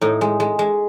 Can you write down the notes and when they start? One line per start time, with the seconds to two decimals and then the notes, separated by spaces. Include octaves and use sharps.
0.01 A2 D#4
0.21 G#3
0.40 G#3
0.59 G#3